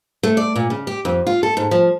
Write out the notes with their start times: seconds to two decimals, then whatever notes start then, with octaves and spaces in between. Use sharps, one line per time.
0.23 A3
0.37 D5
0.56 A#2
0.70 C#3
0.87 G4
1.05 F2
1.27 F4
1.43 A4
1.57 G#2
1.71 F3